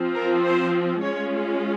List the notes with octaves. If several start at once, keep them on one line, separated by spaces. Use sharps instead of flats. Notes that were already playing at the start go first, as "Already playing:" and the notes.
Already playing: F3 C4 F4
A#4
C5
G#3 C#4 F4 C#5